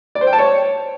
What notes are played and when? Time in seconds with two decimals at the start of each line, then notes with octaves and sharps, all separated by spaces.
0.15 D5
0.21 C5
0.27 G5
0.33 A5
0.38 C#5